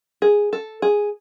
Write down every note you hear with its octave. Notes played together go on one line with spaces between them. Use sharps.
G#4
A4
G#4